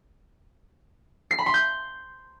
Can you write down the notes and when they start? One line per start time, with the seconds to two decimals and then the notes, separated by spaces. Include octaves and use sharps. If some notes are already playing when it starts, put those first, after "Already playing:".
1.31 C7
1.38 B5
1.46 C6
1.54 G6